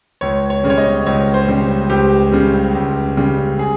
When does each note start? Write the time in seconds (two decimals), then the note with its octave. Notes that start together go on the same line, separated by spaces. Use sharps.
0.21 C#2 C#5
0.50 C#5
0.63 C#3 G3
0.70 C#5
0.78 D#5
1.06 C#2 C#5
1.34 C5
1.48 C#3 G3
1.90 C#2 G4
2.32 C#3 G3
2.75 C#2
3.17 C#3 G3
3.59 G#4